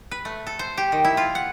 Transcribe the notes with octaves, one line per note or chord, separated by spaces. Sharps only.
B4
A3
A4
C5
G4
D#3
E4
F4
F#5